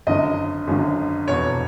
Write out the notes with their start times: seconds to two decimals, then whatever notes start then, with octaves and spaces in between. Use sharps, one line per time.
0.07 G#1 F#2 D3 D#5
0.67 G#1 F#2 D3
1.28 F1 E2 B2 C#5